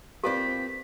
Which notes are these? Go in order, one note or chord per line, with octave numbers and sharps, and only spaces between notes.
A#3 C4 F4 G4 B4 D5 B6